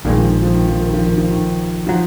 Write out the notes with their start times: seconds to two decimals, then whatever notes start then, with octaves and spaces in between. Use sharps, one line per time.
0.05 A#1 A#2 D#3 G#3
0.18 F3
0.30 D#3
0.43 F3
0.55 D#3
0.68 F3
0.80 D#3
0.93 F3
1.05 D#3
1.18 F3
1.31 D#3
1.86 F3 F#3